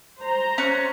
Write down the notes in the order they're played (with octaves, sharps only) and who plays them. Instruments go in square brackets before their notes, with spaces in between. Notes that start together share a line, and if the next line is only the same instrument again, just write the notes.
[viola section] C5 A#5
[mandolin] C#4 C#6 F#6